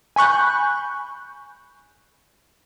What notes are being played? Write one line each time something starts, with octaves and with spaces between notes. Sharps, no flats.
G#5 B5 C#6 F#6 G6